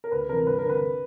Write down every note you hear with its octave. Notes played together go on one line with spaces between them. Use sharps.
A#4
D2 B4
C3 E3 A#4
G2 B4
A#4
D3
B4